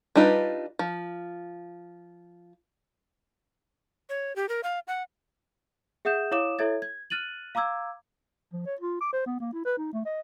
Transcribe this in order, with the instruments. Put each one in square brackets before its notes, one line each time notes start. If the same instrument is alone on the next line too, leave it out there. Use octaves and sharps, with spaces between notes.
[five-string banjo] G3 D4 D#4 F4 B4
F3
[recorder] C#5
G4
A#4
F5
F#5
[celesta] G#4 E5 F#5 D#6 G6 E7
E4 C#5 F5 D6 D#6 E7
E4 A4 C#5 E5 G#6 A6
G#6
F6 F#6 A6 D#7 F#7
F5 A#5 D6 E6 G#6
[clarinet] F3
C#5
F4
D6
C5
B3
A#3
E4
B4
D#4
A3
D#5